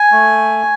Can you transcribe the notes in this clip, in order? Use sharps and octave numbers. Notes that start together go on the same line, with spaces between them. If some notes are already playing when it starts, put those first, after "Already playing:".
Already playing: G#5
A3